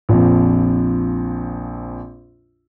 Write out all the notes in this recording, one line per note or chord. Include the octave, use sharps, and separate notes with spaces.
A#1 F2